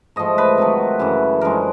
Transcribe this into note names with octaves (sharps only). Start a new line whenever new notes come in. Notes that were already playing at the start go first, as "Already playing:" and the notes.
G#2 F3 A3 D#5
B4
C3 D#3 F#3 A3
F#2 C#3 E3
F#2 D3 F3 G#3 A#4